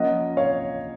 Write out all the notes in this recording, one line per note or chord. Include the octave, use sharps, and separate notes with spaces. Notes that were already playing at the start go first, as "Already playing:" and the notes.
Already playing: F3 A#3 C#4 D#5 F#5
C#5 F5